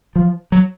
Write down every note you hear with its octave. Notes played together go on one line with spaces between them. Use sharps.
F3
F#3